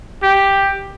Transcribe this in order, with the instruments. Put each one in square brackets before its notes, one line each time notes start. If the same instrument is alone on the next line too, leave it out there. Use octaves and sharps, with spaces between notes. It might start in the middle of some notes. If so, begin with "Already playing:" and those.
[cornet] G4